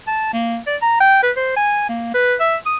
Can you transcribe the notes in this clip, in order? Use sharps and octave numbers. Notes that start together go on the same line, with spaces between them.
A5
A#3
D5
A#5
G5
B4
C5
G#5
A#3
B4
E5
D#6